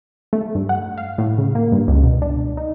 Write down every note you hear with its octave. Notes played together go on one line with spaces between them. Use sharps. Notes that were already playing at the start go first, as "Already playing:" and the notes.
A3
G2
F#5
F5
A2
C#3
A#3
G2
C#2
B2
D4
D#4